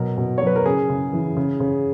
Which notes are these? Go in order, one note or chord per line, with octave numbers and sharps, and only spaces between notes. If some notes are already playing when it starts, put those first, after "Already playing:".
Already playing: B2 F#3 A#4
B2
F#3 C#5
B4
A#4
C#3 G#4
C#3
E3
C#3
C#3